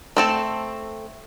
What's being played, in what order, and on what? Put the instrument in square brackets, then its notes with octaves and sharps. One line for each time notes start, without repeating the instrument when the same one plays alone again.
[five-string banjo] A3 C4 A4